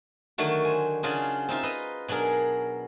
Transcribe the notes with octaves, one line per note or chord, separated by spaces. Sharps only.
D3 D#3 F#3 A3 F#4
C5 G#5
C#3 F#3 D4 F4 G#4
C4 D#4 F4 E5
B4 D#5 A#5
B2 F#3 D4 G#4 A#4